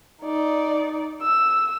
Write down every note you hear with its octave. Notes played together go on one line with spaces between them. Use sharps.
D#4 D5
E6